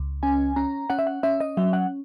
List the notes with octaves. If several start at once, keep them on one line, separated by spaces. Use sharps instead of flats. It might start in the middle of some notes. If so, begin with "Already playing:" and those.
Already playing: C#2
C#4 G#5
C#4 A#5
C#4 F#5
E5
F#5
C#4 E5
D#5
F#3 E5
F#5